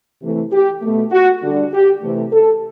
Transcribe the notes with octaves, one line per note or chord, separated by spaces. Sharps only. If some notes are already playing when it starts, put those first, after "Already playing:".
C3 E3 A3
G4
B2 A3
F#4
D3 G3
G4
C3 E3 A3
A4